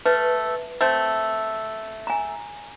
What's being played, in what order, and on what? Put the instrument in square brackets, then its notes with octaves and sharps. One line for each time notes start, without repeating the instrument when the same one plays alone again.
[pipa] A3 [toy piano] B4
[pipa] A3 C4
[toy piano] G#5 A#5